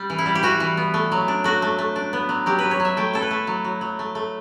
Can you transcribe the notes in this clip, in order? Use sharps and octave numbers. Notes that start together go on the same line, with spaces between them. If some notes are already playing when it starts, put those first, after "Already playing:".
Already playing: G3
E3
E4
G3
G4
E3 F#4
E3
B3
A3
F#3
D4
A3 F#4
A3
A3
D4
B3
F#3
F#3 G4
F#3 B4
C#5
F#3
E5
A3 G5
E4 A4
B4
A3
F#3
F#3
F#3
A3
A3